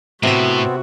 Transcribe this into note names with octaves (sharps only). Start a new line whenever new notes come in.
A2 C3 B3 C4 F#4 E5